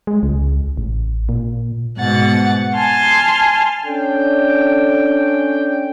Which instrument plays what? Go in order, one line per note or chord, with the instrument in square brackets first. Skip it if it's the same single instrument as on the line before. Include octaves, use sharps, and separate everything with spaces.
[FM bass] G#3
C#2
A1
A#2
[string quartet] G#2 B2 F#5 A6
G#5 A5 C6 F6
[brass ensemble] C#4 D4 A4 G5